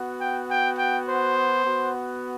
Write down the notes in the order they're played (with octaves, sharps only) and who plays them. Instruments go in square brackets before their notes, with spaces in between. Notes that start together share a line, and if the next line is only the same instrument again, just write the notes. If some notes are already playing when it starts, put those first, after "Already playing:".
Already playing: [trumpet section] B3 F#4
G5
G5
G5
C5
B3 F#4